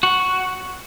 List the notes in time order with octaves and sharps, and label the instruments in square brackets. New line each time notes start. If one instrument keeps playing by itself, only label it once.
[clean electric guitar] F#4